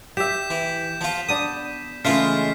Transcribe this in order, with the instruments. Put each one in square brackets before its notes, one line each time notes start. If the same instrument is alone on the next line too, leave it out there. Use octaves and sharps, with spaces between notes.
[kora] G4 E5 [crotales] G6 B6 E7
[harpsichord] E3
F3 F4
[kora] B3 D4 [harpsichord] D#6
[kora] C#3 E3 [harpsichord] G#3 A3 F4 [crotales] F6 B6 C7